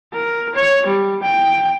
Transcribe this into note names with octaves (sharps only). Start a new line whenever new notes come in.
A#4
C#5
G3
G5